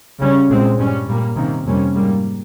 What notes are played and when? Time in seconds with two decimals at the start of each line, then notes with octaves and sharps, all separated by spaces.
0.19 C#3 G3 C#4
0.49 A#2 G#3 C4
0.77 G2 G3 C#4
1.07 A#2 G3 A#3
1.36 C3 D#3 A#3 C#4
1.65 F2 C3 G3 A#3 C#4
1.94 G#2 G3 A#3